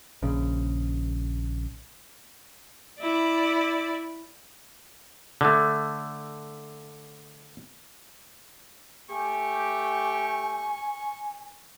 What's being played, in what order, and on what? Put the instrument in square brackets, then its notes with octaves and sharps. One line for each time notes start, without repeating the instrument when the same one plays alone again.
[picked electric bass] A#1 C#3
[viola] E4 D5
[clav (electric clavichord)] D3 A3
[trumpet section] A3 G4 [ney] G#5 [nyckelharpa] C#6